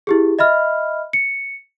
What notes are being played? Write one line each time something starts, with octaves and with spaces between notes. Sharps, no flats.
E4 G4 G#4
D#5 E5 B5 F6
C#7